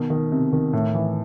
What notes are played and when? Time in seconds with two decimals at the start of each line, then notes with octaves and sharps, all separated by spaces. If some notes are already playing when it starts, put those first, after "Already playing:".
Already playing: B2 D#3
0.10 D#3
0.32 C3
0.53 D#3
0.73 A2
0.94 E3